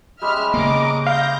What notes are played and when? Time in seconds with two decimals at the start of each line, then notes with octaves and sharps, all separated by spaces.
0.22 G3 G#3 C#4 E5 F6
0.54 C#3 A#3 D#5 A#5 D6
1.07 F5 G6 A#6